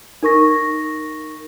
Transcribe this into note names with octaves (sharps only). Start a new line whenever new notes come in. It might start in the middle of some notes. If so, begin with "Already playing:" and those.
D#4 A#4 C#6 A#6